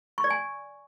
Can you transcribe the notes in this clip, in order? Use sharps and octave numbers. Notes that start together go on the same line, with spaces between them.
C#6
D5
G#5